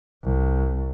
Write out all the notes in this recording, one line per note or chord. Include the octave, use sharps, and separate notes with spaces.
C2